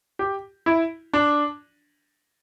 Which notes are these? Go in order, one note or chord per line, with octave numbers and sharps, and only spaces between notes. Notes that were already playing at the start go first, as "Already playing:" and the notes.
G4
E4
D4